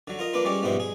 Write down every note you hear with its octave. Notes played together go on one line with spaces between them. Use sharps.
D3 F#3
F4 A#4 D#5
A#3 D4 F4 B4
G3 G#3 C#4 D5
A#1 G#2 B2 G3 E4 C5
G#4